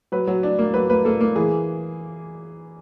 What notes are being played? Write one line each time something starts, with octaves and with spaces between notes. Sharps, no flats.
F#3 B4
F#3
D4
A#3
F#3 B4
A#3 B4
A#3 A4
A#3
E3 G#4